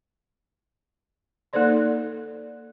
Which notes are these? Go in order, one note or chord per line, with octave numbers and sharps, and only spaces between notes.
A#3 D#4 A4 C5 D5 C6